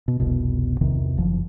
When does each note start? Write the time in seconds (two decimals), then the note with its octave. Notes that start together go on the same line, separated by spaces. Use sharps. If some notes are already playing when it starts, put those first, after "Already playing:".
0.08 B2
0.20 F1 C2 B2
0.81 A#1 E2 C3 D#3
1.17 F#1 F3